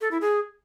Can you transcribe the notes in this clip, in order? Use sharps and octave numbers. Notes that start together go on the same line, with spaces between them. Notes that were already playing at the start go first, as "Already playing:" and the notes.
A4
E4
G#4